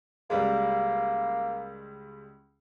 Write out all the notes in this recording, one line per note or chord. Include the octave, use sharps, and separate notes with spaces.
C#2 G3 G#3 A#3